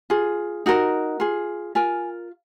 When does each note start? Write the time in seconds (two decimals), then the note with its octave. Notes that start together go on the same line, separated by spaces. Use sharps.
0.10 F4 G#4
0.66 D#4 F#4 A#4
1.20 F4 G#4
1.75 F4 A#4 G#5